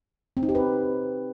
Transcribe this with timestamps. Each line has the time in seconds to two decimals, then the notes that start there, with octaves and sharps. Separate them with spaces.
0.37 C4
0.43 D#4
0.49 G4
0.55 B4